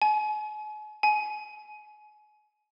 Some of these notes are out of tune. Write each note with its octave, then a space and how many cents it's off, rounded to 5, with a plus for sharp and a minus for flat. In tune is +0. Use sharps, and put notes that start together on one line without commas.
G#5 +40
G#5 +30